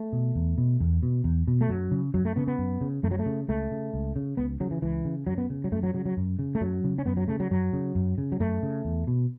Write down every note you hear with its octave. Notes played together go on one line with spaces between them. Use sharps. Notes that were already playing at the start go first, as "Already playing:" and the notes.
Already playing: A3
B2
E2
B2
E2
B2
E2
B2
A3
F#2 F#3
C#3
F#2 F#3
A3
C#3 B3
B3
F#2
C#3
F#2 A3
F#3
A3
C#3
C#2 A3
C#3
C#2
C#3
C#2 B3
C#3 F#3
E3
C#2 E3
C#3
F#2 F#3
B3
C#3
F#3
F#2 A3
F#3
C#3 F#3
F#3
F#2
C#3
A3
F#2 F#3
C#3
C#4
F#2 B3
F#3
C#3 A3
F#3
F#2 F#3
C#3
F#2
C#3
F#3
F#2 A3
C#3
E2
B2